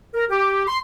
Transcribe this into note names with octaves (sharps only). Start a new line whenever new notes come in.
A#4
G4
C6